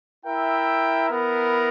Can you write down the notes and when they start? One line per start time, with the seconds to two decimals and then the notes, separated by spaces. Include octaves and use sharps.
0.24 E4 A#4 E5 G5
1.09 B3 E4 A#4